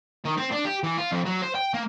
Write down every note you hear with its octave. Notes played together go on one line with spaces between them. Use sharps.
D#3
C4
D4
G4
E3
F4
F2
F#3
C5
G5
A#3